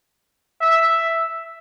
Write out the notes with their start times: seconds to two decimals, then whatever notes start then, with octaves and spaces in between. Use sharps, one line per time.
0.61 E5